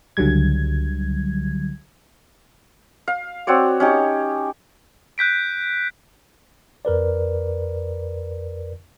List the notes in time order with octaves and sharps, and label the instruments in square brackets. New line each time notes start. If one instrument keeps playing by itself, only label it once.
[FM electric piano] C#2 D3 F#3 G3 G#6
[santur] F5
C4 F#4 C#5 D5
C#4 D#4 G4
[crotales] F#6 G6 B6 D7
[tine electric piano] F2 A#4 B4 D5